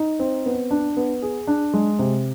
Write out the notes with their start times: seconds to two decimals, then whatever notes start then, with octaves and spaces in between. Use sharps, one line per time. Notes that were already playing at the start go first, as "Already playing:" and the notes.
Already playing: D#4
0.20 C4
0.46 B3
0.71 D4
0.97 B3
1.22 G#4
1.47 D4
1.73 G#3
1.99 C3